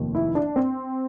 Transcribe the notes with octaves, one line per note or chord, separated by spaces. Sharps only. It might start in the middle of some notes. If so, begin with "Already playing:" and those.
Already playing: F1 D#2 D#3
E4
D4
C4